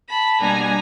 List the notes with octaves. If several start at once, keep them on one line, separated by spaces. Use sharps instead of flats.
A5 B5
B2 G3 A#3 D4 G#5 A#5